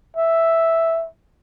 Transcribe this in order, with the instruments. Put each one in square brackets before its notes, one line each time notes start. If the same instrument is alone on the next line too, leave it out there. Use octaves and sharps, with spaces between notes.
[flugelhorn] E5